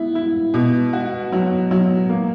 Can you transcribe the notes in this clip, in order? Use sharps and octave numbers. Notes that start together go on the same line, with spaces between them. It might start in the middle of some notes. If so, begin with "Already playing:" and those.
Already playing: B3 E4
E4
B2
F#4
F#3
F#3
A#3